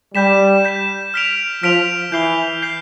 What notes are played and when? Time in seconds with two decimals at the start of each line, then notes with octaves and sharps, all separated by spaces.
0.14 G3 G6 B6 E7
0.65 G6 B6 E7
1.14 F6 B6 D7 F7
1.63 F3 F6 B6 D7 F7
2.12 E3 G6 C7 G7
2.62 G6 C7 G7